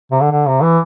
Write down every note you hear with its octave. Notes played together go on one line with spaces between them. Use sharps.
C3
D3
D3
C3
E3